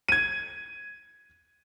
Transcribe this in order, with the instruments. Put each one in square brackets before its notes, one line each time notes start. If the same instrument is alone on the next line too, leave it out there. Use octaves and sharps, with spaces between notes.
[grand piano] G#6 D#7